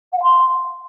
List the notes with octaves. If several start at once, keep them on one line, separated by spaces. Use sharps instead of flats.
F#5
F5
C6